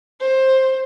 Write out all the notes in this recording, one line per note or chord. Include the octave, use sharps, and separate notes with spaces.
C5